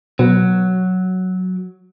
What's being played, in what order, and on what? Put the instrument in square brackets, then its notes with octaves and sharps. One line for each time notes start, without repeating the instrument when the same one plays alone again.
[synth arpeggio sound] B2 [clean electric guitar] F#3